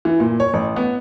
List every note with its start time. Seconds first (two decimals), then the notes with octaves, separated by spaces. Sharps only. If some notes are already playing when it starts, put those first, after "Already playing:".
0.05 E3
0.20 A#2
0.40 C#5
0.54 A1
0.76 B3